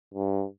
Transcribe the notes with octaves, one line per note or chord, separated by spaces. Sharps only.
G2